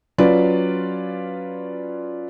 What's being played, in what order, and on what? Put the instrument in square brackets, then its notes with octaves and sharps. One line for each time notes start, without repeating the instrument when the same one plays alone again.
[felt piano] F#3 C#4 F4 B4 D5